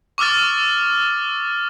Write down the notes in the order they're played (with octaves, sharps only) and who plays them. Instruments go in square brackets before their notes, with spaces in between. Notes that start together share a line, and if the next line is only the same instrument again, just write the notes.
[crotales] C#6 D6 E6 F6 A6